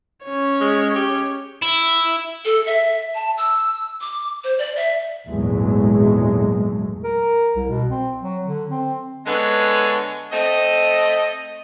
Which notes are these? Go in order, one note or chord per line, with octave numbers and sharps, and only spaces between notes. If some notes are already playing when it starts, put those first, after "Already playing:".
C#4 C#5
G#3
G4
E4
A4
E5
A5
E6
D6
C5
D5
E5
G#1 E2 A#2 F#3 G#3 A3
A#4
C2
B2
C4
F#3
D3
C4
D3 G#3 B3 C#5 G#5
A3 C4 D#5